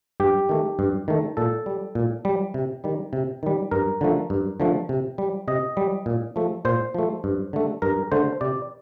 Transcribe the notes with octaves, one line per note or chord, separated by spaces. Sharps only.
G2 G4
D#3 A3
G2
D#3 A3
A#2 A4
G3
A#2
G3
C3
D#3 G3
C3
D#3 G3
G2 A#4
D3 F3 A3
G2
D3 F3 A3
C3
G3
C3 D#5
G3
A#2
F3 A3
A#2 C5
F3 A3
G2
D3 A3
G2 A#4
D3 A3 C5
C3 D5